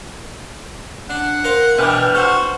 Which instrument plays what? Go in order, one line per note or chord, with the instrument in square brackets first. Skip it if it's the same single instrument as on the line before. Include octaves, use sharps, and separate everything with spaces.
[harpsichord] D4 [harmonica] F#5
[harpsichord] A#4 C5 F5
[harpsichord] B2 E3 [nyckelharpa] D4 B4 [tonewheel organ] G5 F6
[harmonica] F#4 [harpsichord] A4 [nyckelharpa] C5